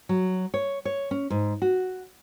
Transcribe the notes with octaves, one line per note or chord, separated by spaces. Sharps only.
F#3
C#5
C#5
C#4
G#2
F#4